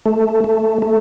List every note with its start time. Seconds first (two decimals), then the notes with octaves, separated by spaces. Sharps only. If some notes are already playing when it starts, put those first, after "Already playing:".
0.06 A3
0.44 A3
0.82 A3